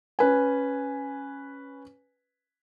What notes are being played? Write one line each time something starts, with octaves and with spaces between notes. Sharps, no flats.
C#4 B4 G#5